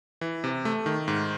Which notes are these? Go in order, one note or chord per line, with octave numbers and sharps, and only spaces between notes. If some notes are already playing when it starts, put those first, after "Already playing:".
E3
C3
A3
D#3
G#2